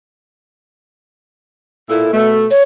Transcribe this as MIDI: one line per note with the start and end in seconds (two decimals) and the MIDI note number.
1.89 2.10 46
1.89 2.10 64
1.89 2.31 69
2.13 2.47 47
2.13 2.47 57
2.51 2.63 73